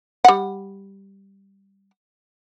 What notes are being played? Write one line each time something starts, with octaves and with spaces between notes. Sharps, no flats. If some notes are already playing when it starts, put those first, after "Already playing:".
G3 F#5